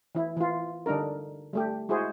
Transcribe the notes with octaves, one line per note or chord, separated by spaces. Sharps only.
E3 E4
E3 F4
D3 G3 D4 D#4 A#4
G3 A3 G4
G#3 E4 F#4 G#4 C5